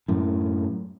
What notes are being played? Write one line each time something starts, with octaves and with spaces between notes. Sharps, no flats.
F#2 A2